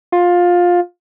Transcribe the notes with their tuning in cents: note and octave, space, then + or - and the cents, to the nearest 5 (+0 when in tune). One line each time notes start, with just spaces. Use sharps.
F4 +15